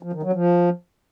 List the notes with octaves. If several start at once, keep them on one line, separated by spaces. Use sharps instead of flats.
F3
D#3
F#3
F3